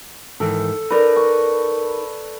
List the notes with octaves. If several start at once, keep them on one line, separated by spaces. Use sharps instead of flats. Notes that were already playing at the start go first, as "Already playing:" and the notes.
G#2 D#3 E3 A4
D#4 A#4 B4 D5
C#6